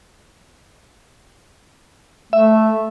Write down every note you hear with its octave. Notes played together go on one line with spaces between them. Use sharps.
A3 E5